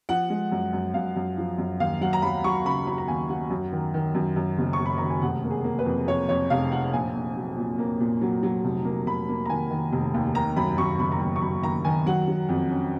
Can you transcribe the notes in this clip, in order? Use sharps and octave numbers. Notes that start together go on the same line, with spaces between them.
F3 F#5
G#3
F#2
F#2
F#2 F5
F#2
F3
F#2
D#2 F5
F#3 F#5
A#5
F#3 B5
F#3 C#6
C#3 B5
F#3 B5
A#5
D#2 G#5
F#3 F#5
F#2
D#3
D#3
F#2
F#2
F#1
C#6
F#1
B5
D#3 A#5
G#5
F1 F#5
A#3
G#4
A#3
B4
F2
F2 C#5
F2 C#5
F1 F5
F2 F#5
A#1 G#5
A#1
F#3
A#2
A#3
A#2
F#3
F#3
F1
A#3
F1 B5
A#3
A#5
D#3 G#5
D#3
F1
D#2
D#3 A#5
F#2 B5
F#2 C#6
F#1 B5
A#5
F#3 B5
C#6
F#2 B5
D#3 A#5
D#3 G#5
F#3 F#5
F#3
F2
C#4